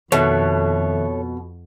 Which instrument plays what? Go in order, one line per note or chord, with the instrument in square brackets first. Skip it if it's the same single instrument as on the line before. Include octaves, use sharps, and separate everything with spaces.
[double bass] F2 [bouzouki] B2 [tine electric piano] D#3 E5 F#6 [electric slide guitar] A4 C#5